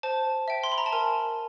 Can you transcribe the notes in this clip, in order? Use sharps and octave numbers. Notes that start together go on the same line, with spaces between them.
C5 A5
E5 G5
C6
B5
A#5
A5
A#4 G#5